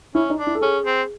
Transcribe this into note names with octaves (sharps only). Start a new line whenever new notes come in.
C#4 E4
D#4
D4
E4
A4
C#4 G#4
C4